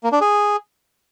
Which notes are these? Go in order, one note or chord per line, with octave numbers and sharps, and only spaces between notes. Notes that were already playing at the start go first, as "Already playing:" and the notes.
A#3
D4
G#4